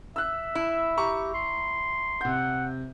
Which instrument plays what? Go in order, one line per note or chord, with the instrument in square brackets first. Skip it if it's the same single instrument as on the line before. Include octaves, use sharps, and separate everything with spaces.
[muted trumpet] E5 [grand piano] E6 F#6
[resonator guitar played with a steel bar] E4
[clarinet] G4 [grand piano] A#5 C#6
[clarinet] C6
[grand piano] C3 G6 [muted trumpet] F#5